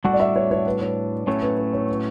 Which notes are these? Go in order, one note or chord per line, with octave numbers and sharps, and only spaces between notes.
A2 G3 D4 F#4 A4 F#5
D5
E5
C#5
C#5
B4
C#5
A2 F#3 A3 C#4 C#5
B4
C#5
C#5
B4